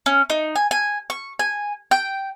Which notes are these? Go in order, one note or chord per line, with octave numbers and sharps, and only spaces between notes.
C#4
D#4
G#5
G#5
C#6
G#5
G5